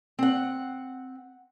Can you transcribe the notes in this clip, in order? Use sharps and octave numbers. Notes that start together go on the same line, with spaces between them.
C4 F#5